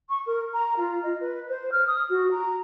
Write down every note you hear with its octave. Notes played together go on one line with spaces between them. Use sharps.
C#6
A#4
A#5
F4
D#5
B4
C5
F6
D#6
F#4
A#5